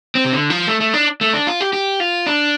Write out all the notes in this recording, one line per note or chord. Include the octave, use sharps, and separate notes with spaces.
C4
C3
D3
F3
A3
A3
D4
A3
D4
F4
G4
G4
F4
D4